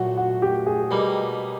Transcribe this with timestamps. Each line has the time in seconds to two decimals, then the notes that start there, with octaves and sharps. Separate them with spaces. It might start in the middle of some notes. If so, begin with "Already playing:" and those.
Already playing: A#2 F#3 A3 F#4
0.17 F#4
0.42 G4
0.66 G#4
0.91 B2 G3 A#3 D#4